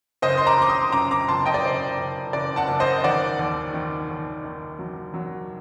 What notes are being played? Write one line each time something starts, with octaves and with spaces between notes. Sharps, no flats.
F#1 C5 D#5
C6
A#5 D6
F#1 D6
C6 D#6
F#2 A#5 D6
A#5 D6
F#1 A5 C6
D#5 G5
D5
F#1 C5
F#1
F#1 D5
F#5 A5
F#1
C5 D#5
D#3 D5 F#5
D#2
D#3
D#2
D#3
F#3
F#3